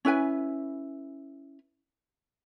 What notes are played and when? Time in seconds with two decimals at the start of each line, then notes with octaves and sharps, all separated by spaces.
0.05 C#4 E4 B4 G#5